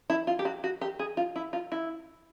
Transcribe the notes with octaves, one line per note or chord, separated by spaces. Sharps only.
E4
F4
G4
F#4
F#4
G4
G#4
F4
E4
F4
E4